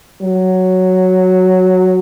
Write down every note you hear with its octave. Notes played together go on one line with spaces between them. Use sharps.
F#3